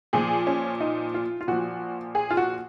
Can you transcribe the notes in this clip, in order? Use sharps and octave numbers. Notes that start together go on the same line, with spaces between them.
A#2 F3 G#4
C#4
D#4
F4
F4
A#2 F3 F#4
G#4
F4
F#4